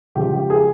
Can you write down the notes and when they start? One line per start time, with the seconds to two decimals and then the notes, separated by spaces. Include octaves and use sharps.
0.15 C#3 F3 G#3 G4
0.34 G4
0.50 G#4